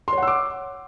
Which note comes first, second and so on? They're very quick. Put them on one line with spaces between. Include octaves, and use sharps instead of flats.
C6 C#5 F#5 E6 D6